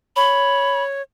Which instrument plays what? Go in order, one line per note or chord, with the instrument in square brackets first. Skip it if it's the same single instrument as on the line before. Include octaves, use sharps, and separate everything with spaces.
[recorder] C#5 [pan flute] B5